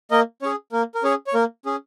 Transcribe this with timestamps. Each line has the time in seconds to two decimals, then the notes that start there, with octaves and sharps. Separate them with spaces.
0.11 A#3 A#4 D#5
0.42 C#4 G#4 C#5
0.72 A#3 A#4
0.95 A#4
1.04 C#4 G#4 C#5
1.27 C#5
1.34 A#3 A#4
1.66 C#4 G#4